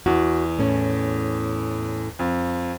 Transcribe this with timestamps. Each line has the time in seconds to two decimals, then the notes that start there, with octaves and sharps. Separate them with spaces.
0.06 E2 F#4
0.59 A2 C#4
2.19 F2